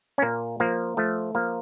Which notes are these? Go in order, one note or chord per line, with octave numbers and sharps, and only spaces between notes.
C#4
A#2 A#3
F3 A#3
F3 A3
F3 A#3